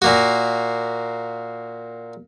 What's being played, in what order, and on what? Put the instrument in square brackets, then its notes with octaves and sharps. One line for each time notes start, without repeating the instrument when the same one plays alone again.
[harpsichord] A#2 A#3 F#4